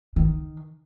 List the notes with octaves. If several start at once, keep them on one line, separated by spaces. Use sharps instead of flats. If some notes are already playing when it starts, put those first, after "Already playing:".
D#3